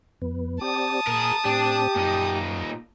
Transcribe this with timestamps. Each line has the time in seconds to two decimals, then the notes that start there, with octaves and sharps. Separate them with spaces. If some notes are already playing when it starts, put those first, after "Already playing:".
0.22 F2 B3
0.61 C4 G4 D5 A5 D#6
1.07 A#2 G#4 A#4
1.45 A2 C4 D4 G4
1.96 F#2 A#2 D#4